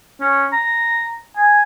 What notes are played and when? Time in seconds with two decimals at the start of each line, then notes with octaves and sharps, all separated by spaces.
0.21 C#4
0.52 A#5
1.37 G#5